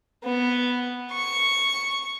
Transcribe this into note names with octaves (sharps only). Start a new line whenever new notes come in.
B3
C#6